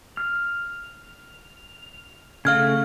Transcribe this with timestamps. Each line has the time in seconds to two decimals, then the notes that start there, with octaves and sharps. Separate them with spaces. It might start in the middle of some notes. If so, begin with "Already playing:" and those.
0.17 F6
2.45 C#3 A3 F5 F6 G#6